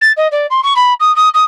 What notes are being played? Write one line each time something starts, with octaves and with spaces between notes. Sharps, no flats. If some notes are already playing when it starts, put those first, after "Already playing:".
A6
D#5
D5
C6
C#6
B5
D#6
D#6
D#6